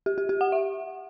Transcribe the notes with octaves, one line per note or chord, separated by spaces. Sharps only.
G4
G4
G4
F#5
E5